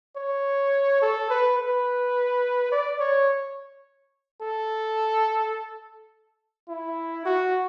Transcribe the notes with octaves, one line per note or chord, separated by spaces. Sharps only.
C#5
A4
B4
B4
D5
C#5
A4
E4
F#4